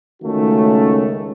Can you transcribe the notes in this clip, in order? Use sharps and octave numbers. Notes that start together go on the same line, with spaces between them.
C#2 D#3 A3 C#4 F#4